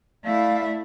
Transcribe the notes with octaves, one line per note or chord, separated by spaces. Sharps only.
A3 E4 D5 F5